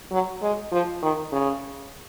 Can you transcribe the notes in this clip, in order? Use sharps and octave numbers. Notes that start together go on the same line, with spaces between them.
F#3
G#3
F3
D#3
C#3